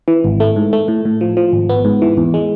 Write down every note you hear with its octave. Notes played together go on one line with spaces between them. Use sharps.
E3
G#1
A3
G#2
A3
A2
A2
F3
F3
G#1
B3
G#2
E3
E2
G#3